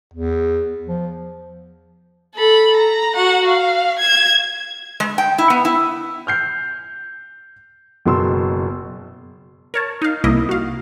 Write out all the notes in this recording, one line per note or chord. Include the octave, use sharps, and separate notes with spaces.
E2
F3
A4 B5
A#5
F#4 F#5
F5
G#6 E7
G#3
G5
E4
B3
E4
F6 G6 C7
F#1 B2 C6 E6
A#4 C#5 A5
D#4 F5
C2 A#3 E4 D#5
F#4 F5